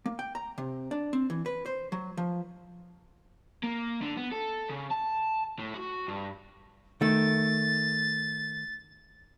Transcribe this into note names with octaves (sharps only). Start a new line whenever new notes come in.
A#3
G5
A#5
C3
D4
C4
E3
B4
C5
F#3
F3
A#3
D3
B3
A4
C#3
A5
A2
F#4
G2
D#3 A3 A6